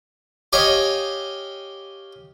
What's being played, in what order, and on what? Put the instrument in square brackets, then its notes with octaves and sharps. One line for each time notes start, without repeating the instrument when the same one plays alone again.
[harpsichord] G4 C#5 D#5 F5 G5 G#5